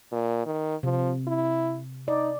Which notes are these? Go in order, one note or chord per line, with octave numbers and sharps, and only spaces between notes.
A#2
D#3
C3 F3
E4
D#4 D5